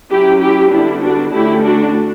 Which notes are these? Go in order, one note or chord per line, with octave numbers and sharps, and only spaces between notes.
F#3 C#4 E4 G4
E4 G4
D3 G3 B3 D4 E4
D4 F#4
D3 A3 C#4 E4 G4
D4 F#4